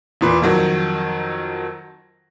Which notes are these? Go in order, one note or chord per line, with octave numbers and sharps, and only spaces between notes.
E1 A#2 B4
F2 D#3 F#3